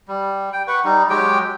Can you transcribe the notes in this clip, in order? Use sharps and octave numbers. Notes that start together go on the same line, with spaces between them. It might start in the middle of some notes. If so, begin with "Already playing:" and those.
G3
G5
B4 F#5 C#6
G3 D#4
F#3 G#3 G4 G5